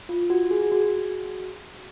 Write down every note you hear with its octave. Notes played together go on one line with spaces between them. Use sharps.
F4
F#4
G#4
F#4